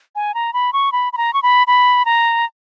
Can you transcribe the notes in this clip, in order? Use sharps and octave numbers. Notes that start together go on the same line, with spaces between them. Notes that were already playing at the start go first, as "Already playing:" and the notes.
G#5
A#5
B5
C#6
B5
B5
A#5
C#6
B5
B5
A#5